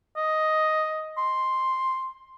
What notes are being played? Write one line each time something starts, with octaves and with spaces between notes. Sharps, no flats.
D#5
C6